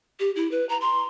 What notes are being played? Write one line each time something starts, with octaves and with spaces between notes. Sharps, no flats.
G4
E4
B4
A#5
C6